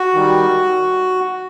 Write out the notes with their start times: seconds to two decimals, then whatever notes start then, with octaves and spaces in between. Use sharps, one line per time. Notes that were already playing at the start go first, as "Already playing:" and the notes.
Already playing: F#4
0.14 D#3 G3